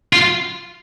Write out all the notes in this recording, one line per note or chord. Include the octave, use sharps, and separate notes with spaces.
F4